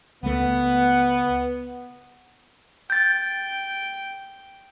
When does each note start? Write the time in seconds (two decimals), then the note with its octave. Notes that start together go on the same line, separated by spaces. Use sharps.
0.23 C#2 A3 B3
2.90 G5 G6 A6